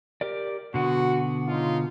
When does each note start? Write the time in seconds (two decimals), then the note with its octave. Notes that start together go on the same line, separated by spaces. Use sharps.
0.21 G4 A#4 D5
0.74 B2 D3 B3 F#4
1.47 C#3 D#4 F4